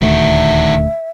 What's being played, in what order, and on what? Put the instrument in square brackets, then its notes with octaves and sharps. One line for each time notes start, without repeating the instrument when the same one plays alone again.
[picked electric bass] D#1 D2 A3 [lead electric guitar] D#3 F#4 [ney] E5